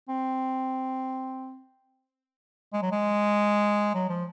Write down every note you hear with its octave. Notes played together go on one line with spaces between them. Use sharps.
C4
G#3
F#3
G#3
F#3
F3